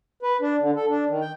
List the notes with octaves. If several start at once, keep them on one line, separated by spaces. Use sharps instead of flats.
B4
D4
D3
A4
D4
D#3
G5